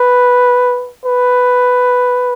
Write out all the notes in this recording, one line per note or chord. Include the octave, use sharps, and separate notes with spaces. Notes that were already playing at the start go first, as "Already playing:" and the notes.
Already playing: B4
B4